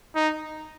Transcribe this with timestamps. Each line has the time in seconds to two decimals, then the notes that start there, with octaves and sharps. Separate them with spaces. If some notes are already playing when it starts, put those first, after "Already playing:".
0.15 D#4